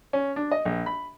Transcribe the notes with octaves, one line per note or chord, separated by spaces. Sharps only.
C#4
D4
D#5
A#1
B5